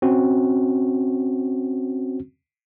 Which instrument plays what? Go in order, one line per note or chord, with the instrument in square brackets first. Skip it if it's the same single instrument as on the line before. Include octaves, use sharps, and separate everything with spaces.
[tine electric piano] C4 C#4 F#4